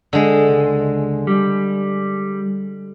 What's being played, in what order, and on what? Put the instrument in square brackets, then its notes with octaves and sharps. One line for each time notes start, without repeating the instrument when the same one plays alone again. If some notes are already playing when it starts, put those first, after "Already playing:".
[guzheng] D3 G#3
[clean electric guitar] C#2
G3